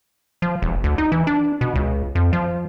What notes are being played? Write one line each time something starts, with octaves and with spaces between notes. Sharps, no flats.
F3
E1
D2
D#4
E3
D4
B2
C#2
F2
F3